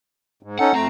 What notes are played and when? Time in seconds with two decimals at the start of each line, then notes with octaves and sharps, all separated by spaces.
0.43 G#2
0.59 C#4 D#4 A4 F#5
0.74 F2 A3 C4 A#5